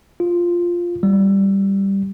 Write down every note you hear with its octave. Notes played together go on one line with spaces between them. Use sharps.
F4
G3